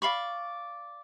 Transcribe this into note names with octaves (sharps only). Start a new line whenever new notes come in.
D5 F5 B5 C#6